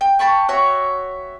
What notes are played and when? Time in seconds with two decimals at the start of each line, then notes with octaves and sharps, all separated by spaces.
0.01 G5
0.19 G5 A5 B5 C#6
0.49 F#4 C#5 E5